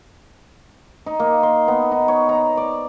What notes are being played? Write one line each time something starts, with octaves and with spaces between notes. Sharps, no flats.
D#4
A#3
C6
B3
D#4
C#5
A#5
D5